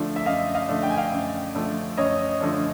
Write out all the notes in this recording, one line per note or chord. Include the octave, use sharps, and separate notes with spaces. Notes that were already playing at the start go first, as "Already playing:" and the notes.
Already playing: D3 F3 A3 D4
E5
F#2 D#5 F5
D#5 F5
D3 F3 A3 D4
G5
G#5
F5 G5
F#2
D3 F3 A3 D4
F#2 C#5 D#5
D3 F3 A3 D4